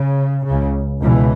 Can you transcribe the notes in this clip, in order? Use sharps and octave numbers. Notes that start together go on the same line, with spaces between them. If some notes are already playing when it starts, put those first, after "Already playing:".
Already playing: C#3
C#3
C#2
C#2 B2 E3